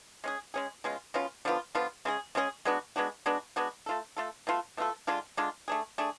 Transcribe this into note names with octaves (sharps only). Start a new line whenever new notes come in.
G#3 C#4 G#4
G#3 C#4 G#4
B2 G#3 C#4 F4
B2 G#3 C#4 F4
D3 F3 B3 F4
D3 F3 B3 F4
C#3 G#3 C#4 G#4
C#3 G#3 C#4 G#4
G#3 B3 D4 F#4
G#3 B3 D4 F#4
G#3 B3 D4 F#4
G#3 B3 D4 F#4
A3 F4 A4
A3 F4 A4
B2 A3 F4 A4
B2 A3 F4 A4
D3 G#3 D4 F4
D3 G#3 D4 F4
A3 D4 G#4
A3 D4 G#4